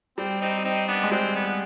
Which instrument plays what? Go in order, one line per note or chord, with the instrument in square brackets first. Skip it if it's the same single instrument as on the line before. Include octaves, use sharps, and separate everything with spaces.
[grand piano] G3 [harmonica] C4
[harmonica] C4 D#4
C4 D#4
B3 D4
[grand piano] G#3
[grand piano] G3 [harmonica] C4
[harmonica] B3